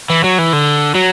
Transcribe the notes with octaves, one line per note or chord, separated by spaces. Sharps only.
E3
F#3
E3
D3
F#3